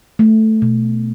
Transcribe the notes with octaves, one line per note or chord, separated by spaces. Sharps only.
A3
B2